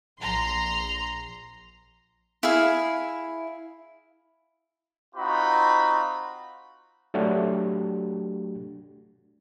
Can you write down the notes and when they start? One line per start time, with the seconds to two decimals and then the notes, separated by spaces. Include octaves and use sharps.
0.20 A#1 A#5 C6
2.43 E4 G#4 F5
5.15 C4 D#4 F4 F#4 B5
7.14 F#3 A3 D4 F#4 G4